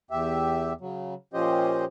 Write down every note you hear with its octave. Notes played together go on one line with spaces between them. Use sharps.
E2 G4 E5
C#3 F#3
A#2 F3 C#4 G4 C5 D#5